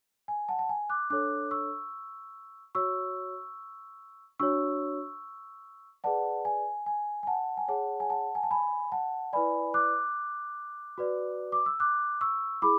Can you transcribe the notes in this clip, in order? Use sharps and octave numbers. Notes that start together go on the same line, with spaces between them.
G#5
F#5 A5
A5
G#5
D6 F#6
D4 A4 C#5 D6 F#6
C#6 E6
F#4 C#5 C#6 E6
D4 F#4 C#5 C#6 E6
G#4 B4 D5 F#5 A5
G#5
G#5
G#5
F#5 A5
G#5
G#4 C#5 F#5 A5
G#5
F#5 A5
G#5
A5
G#5 B5
F#5 A5
E4 B4 D5 G#5 B5
D6 F#6
F#4 B4 D5
D6
E6
D6 F#6
C#6 E6
E4 G#4 B5 D6